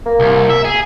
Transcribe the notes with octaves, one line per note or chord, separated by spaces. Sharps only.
A#3
C2
E5
G#4